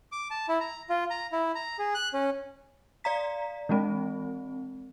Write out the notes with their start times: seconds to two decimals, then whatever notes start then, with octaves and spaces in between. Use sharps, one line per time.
0.12 D6
0.30 A5
0.48 E4
0.60 A#5
0.89 F4
1.10 A#5
1.32 E4
1.55 A#5
1.79 G#4
1.95 F#6
2.13 C#4
3.04 D5 F5 A#5 B6
3.69 E3 G#3 C4